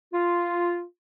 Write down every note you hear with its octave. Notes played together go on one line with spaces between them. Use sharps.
F4